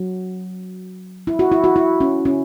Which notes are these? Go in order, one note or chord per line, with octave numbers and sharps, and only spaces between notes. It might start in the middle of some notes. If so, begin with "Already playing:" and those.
Already playing: F#3
E4
F#4
E4
F#4
E4
C#4
C#4